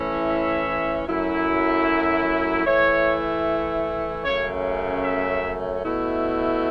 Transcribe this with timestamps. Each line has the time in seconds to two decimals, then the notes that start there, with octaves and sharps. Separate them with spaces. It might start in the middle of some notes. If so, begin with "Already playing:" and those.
Already playing: A2 E3 C#4 E4
0.29 E5
1.08 F#2 F#3 A3 E4
2.66 E3 A3 E4 C#5
4.24 F#2 C#3 A3 C#4 C#5
5.03 E5
5.82 B2 A3 E4